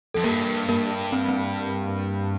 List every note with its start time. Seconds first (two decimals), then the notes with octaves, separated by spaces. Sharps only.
0.14 F2 A4
0.24 G2 A#3 A#4
0.69 A#3 A#4
1.12 C4
1.29 C4